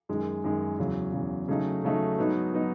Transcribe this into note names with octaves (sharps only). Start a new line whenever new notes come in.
F#2 D#3 G#3
F#2 D#3 G#3
E2 C#3 F#3
E2 C#3 F#3
C#3 F#3 A3 D#4
C#3 F#3 A3 D#4
G#2 F#3 B3 D#4
F#3 B3 D#4